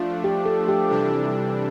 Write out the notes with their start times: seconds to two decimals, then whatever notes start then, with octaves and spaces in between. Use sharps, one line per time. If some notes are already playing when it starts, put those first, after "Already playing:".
Already playing: F3 A3 D4 F4
0.24 G4
0.45 A4
0.68 G4
0.90 C3 E3 G3 D4 A4